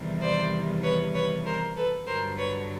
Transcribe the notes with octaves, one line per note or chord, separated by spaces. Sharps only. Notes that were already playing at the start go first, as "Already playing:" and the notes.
Already playing: E2 C3 D#3 G3
C5 D5
B4 C#5
B4 C#5
A#4 C5
A4 B4
G2 D3 F#3 A#4 C5
B4 C#5